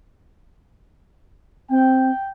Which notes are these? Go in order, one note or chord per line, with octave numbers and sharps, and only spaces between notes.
C4 G5